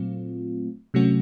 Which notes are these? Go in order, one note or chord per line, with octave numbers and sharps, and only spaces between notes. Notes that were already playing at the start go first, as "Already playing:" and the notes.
Already playing: A#2 F#3 A3 C4 F4
C3 F#3 A3 C#4 F#4